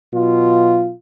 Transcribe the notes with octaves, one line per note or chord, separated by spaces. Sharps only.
B2 F#3 F4